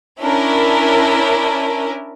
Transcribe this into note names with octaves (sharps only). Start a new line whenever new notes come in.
C#4 D4 E4 A#4